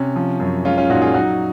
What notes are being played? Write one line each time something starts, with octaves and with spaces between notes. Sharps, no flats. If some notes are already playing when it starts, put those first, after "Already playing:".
Already playing: C3 C#4
F3
F#2
G#3 C#4 F4
C#4 F4
A#2 D#4 F#4
F4 G#4
F#3 D#4 F#4